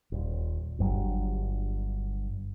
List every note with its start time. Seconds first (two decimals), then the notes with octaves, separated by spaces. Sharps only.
0.12 D#1
0.78 G1 G2 F#3